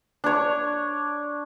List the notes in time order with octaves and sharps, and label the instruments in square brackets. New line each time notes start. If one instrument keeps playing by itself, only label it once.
[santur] D4 C#5